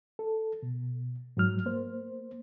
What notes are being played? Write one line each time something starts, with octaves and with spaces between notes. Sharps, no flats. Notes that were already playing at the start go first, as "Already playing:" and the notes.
A4
B2
G#2 F#3 F6
A#3 C5